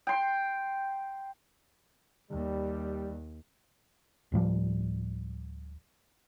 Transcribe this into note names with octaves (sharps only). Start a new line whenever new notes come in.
G5 C6
D#2 G3
D1 A2 F3 G3